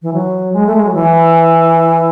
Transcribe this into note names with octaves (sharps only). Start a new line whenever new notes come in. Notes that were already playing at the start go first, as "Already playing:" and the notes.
E3
F#3
G#3
A3
G#3
F#3
E3